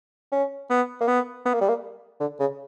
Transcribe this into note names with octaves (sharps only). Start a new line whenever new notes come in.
C#4
B3
A#3
B3
B3
A#3
G3
A#3
D3
C#3